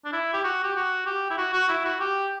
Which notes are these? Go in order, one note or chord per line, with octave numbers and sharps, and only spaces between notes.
D4
E4
G4
F#4
G4
F#4
G4
E4
F#4
F#4
E4
F#4
G4